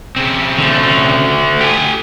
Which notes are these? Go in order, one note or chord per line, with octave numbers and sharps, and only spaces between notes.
C#3 C4
D3 A3
G4 G#5